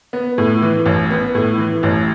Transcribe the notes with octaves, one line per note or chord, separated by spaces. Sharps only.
B3
A2
E3
A1
B3
A2
E3
A1